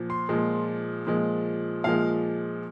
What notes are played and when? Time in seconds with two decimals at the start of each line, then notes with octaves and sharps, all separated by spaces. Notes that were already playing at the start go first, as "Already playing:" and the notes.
Already playing: A#2 F3
0.10 C6
0.29 A#2 F3 G#3
1.07 A#2 F3 G#3
1.84 A#2 F3 G#3 F5